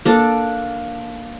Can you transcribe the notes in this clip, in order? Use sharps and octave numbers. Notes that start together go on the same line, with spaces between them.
A#3 D4 A4